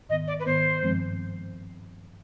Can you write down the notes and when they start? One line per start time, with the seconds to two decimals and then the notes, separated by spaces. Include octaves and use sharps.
0.09 G#2 D#3 B3 D#5
0.27 D5
0.39 B4
0.46 G#2 D#3 B3 C5
0.83 G2 F3 G#3 C4